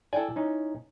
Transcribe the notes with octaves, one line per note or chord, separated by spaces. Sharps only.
E4 A4 D5 G5 G#5
C#4 D#4